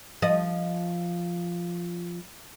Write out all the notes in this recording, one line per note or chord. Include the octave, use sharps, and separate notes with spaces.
F3 D#5